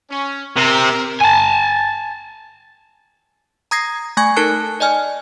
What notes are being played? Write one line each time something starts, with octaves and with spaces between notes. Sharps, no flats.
C#4
C3 A#4
G#5 A5
A#5 D#6 G#6 A#6 C7
A3 G#5 C#6 G#6
D#4 A4 A#4 A5 F#6 C#7
D5 D#5 G#5 F6